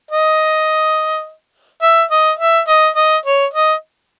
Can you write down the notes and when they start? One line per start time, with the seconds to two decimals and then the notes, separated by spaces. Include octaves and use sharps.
0.11 D#5
1.83 E5
2.11 D#5
2.39 E5
2.68 D#5
2.96 D#5
3.26 C#5
3.53 D#5